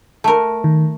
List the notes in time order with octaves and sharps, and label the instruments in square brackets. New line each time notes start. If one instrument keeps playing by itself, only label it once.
[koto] A3 A#4
[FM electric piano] D#3